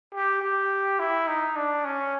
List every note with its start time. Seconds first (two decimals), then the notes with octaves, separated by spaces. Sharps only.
0.14 G4
0.42 G4
1.00 E4
1.28 D#4
1.56 D4
1.85 C#4